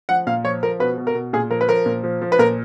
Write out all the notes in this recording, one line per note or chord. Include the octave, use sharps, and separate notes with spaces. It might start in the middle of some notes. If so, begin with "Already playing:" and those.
F3 F#5
A#2 F5
F3 C#5
F3 A#4
B2 B4
B2
A#4
B2
A#2 G#4
F3 A#4
B4
F3 A#4
A#2
F3
F3
B4
A#2 A#4